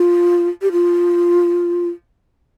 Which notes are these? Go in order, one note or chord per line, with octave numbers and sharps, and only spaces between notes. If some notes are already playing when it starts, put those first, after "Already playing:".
Already playing: F4
G4
F4